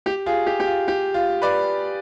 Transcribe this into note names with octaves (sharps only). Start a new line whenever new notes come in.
G4
F4 G#4
G4
G4
F4
G4
F4
B4 D5